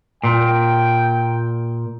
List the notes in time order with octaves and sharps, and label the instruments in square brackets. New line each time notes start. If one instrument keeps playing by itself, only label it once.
[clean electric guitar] A#2 [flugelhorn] G5